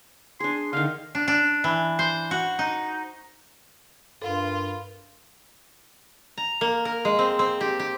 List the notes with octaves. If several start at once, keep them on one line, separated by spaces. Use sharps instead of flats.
D4 G#4 C6
D3 D#3 F5
D4
D4
E3
C5
F#4
D#4
G2 F4 A4 A#4 F5 B5 C6
A#5
A#3
A#4
G#3
C4
C4
G4
G4